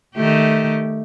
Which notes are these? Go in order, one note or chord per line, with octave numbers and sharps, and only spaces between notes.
D#3 A3 G4